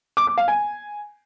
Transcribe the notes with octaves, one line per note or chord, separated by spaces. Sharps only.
D6
D6
F5
G#5